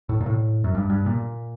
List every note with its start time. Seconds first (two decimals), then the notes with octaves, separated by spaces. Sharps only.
0.09 A2
0.21 A#2
0.26 A2
0.64 F#2
0.75 G2
0.90 G2
1.06 A#2